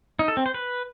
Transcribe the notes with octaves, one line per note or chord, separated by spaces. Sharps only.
D#4
A4
C4
C5
B4